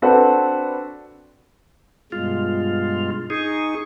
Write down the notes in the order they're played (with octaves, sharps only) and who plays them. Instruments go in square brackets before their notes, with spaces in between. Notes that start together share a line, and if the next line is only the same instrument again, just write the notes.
[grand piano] C4 D4 F#4 A4 B4
[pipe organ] G2 B2 G#3 [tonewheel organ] F4
[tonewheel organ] D#4 G#4 [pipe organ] C#6